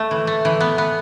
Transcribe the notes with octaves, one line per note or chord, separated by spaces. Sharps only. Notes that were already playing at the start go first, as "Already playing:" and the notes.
Already playing: A3
E3
A3
E3
B3
B3